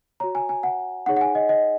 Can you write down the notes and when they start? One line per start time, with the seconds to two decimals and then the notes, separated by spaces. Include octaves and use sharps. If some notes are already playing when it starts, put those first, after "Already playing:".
0.20 F#4 C#5 A#5
0.35 G#5
0.49 G#5
0.63 F#5
1.06 D#4 G#4 C#5 F#5
1.17 F#5
1.21 G#5
1.35 D#5
1.49 D#5